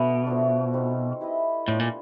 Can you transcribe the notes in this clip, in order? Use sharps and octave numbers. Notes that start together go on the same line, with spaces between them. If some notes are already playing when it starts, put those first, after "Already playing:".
Already playing: B2 A3 B3 D4 F#4 B4
F3 A3 D4
C4 D#4 F#4 B4
E4 G4 B4 D#5
A2 B3 D4 F4
A#2